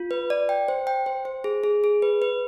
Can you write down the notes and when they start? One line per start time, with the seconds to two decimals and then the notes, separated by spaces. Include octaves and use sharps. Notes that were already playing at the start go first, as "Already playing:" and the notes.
Already playing: F4
0.11 B4
0.30 D5
0.49 G5
0.68 C5
0.87 G5
1.06 C5
1.25 C5
1.44 G#4
1.64 G#4
1.84 G#4
2.02 B4
2.22 B4